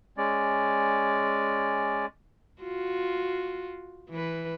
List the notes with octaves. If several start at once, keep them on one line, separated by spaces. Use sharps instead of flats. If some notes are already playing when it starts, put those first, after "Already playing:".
G#3 C#4 D5
F4 F#4
E3 B4